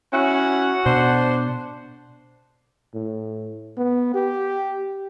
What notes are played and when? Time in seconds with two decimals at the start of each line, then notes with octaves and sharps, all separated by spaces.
0.13 C#4 E4 F#4 F#5
0.86 B2 D4 C5
2.94 A2
3.77 B3
4.14 G4